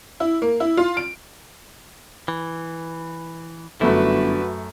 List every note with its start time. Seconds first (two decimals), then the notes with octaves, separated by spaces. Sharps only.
0.20 E4
0.42 A#3
0.60 E4
0.77 F4
0.97 D7
2.28 E3
3.81 G1 F#2 D3 A3 E4 F#4 B4